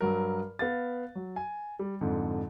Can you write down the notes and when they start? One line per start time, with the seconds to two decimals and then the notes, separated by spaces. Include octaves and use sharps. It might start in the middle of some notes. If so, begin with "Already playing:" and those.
0.01 G2 F#3 A#4
0.59 B3 F5 A6
1.15 F#3
1.36 G#5
1.79 G3
2.01 F2 G#2 D3